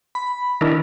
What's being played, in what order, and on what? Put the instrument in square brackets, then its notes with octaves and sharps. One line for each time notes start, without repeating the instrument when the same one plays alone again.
[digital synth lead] B5
[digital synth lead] D#3 [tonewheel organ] D4 E4 A#4